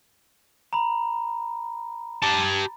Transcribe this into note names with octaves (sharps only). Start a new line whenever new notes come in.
A#5 B5
G4 A5